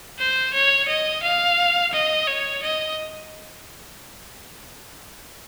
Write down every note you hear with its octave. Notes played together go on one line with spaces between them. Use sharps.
C5
C#5
D#5
F5
D#5
C#5
D#5